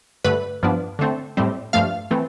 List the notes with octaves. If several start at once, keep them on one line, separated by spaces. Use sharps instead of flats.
G2 D3 A3 B4
G2 F3 B3 D4
D3 A3 C4
A2 G3 C4
G2 F3 A3 F5
E3 A3 C4